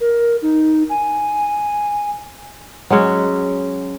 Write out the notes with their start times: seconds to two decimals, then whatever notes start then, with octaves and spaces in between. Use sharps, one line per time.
0.01 A#4
0.42 D#4
0.90 G#5
2.90 F#3 G#3 C#4 F#4